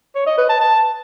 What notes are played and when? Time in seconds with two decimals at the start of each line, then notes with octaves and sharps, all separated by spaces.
0.15 C#5
0.26 D#5
0.38 B4
0.49 A5
0.60 A5